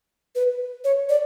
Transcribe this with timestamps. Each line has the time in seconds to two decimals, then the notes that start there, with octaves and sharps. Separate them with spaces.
0.35 B4
0.84 C#5
1.09 D5